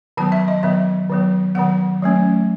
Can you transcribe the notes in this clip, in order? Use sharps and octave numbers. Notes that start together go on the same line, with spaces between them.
D#3 F#3 B3 A5
E5
D#5
D#3 F#3 B3 E5
D#3 F#3 B3
D#3 F#3 B3 F#5
F#3 A3 C#4